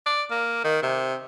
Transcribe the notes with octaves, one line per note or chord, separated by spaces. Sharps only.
D5
A#3
D#3
C3